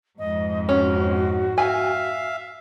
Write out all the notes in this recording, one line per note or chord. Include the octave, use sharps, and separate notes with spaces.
F2 G#2 D#5
C#4 F#4
E5 F5 G#5